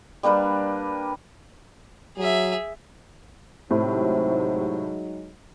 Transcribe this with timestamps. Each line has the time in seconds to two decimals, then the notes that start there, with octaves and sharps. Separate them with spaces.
0.23 G3 A#3 D4 B4
2.18 F#3 G#4 E5
3.71 A2 C3 F#3 G#3 D#4